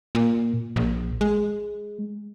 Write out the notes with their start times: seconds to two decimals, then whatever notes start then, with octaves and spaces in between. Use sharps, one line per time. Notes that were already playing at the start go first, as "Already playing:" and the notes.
0.15 A#2
0.76 A#1
1.21 G#3